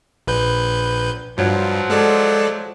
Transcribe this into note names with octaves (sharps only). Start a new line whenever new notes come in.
A#1 B4 G6
G2 F3 F#3
G#3 A4 D5